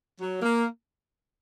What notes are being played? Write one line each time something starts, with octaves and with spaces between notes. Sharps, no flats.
F#3
A#3